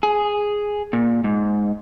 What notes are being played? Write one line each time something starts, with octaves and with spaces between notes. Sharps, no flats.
G#4
A#2
G#2